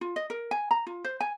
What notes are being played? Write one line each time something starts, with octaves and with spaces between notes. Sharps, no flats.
F4
D#5
A#4
G#5
A#5
F4
C5
G#5